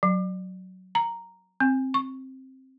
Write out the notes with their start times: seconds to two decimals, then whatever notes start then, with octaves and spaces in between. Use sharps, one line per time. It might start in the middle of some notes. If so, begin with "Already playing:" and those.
0.03 F#3
0.95 A#5
1.60 C4
1.94 C#6